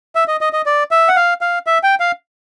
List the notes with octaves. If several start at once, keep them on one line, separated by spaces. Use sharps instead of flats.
E5
D#5
D#5
D#5
D5
E5
F#5
F5
F5
E5
G5
F5